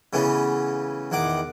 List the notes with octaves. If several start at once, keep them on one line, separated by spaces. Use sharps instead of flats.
C#3 E3 A3 B3 C#4
E2 D#3 F#5 D6